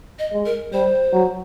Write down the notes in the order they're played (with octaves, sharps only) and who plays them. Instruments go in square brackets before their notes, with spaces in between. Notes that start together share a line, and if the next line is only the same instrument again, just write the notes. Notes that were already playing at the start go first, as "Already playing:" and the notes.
[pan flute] D#5
[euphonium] G#3
[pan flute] A#4
[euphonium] G3 [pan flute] C5
[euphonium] F#3